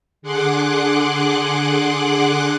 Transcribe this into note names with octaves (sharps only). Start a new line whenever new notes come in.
D3 G#4 F#5 C6 D6 F#6